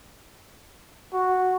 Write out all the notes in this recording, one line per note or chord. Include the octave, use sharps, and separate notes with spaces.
F#4